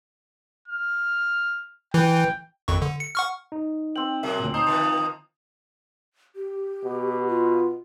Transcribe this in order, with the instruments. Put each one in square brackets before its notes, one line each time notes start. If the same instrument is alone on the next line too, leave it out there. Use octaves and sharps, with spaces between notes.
[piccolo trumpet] F6
[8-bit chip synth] E3 [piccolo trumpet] G5
[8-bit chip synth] G#1 F2 C#6
D3
C#7
F#5 C#6 F6
[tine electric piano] D#4
[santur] C4 G5 [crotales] F#7
[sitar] B2 F#3 G#3 [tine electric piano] A#4 E5
[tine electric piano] D2 A#2
[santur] D#4 [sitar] C5 [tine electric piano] A5 [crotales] D#6
[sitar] D3 D#3 F3 [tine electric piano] A5
[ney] G4
[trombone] B2
[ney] F4